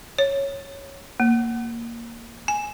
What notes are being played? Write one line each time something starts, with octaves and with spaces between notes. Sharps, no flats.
C#5
A#3
G#5